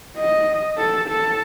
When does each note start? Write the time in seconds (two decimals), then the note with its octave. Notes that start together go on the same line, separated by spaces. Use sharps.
0.18 D#5
0.78 A4
1.09 A4